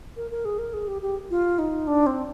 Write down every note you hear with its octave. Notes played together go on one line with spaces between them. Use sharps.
A#4
A#4
G#4
A#4
G#4
G4
G4
F4
D#4
D4
C4